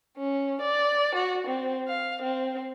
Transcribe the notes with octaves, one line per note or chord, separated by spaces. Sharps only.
C#4
D5
F#4
C4
F5
C4